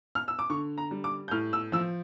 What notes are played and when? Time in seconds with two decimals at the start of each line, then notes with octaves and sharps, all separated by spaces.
0.15 F6
0.28 E6
0.39 D6
0.50 D3 C#6
0.78 A#5
0.91 G3
1.04 D6
1.28 G6
1.31 A2 F6
1.53 E6
1.72 F3 E6